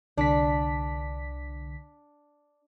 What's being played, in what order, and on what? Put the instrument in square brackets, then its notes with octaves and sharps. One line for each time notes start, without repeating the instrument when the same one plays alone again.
[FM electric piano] C2 D3 B6 [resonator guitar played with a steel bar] D4